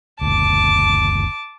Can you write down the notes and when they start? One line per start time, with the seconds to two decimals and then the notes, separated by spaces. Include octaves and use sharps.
0.21 F#1 D2 A5 D6